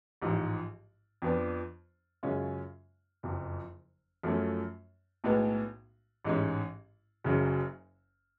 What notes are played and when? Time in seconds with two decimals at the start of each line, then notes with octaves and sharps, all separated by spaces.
0.22 A1 G#2 F3
1.22 F2 F3 B3 D4
2.23 F#2 C#3 G#3 C#4 F4
3.23 F#1 F2 F3
4.23 F#2 F3 A3 C#4
5.24 B1 A2 G#3 B3
6.25 A1 G#2 G#3 C#4
7.24 F#1 F#2 C#3 F#3 C#4